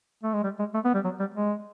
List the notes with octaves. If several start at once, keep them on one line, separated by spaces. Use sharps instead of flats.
A3
G#3
G3
G#3
A3
B3
G3
F#3
G3
G#3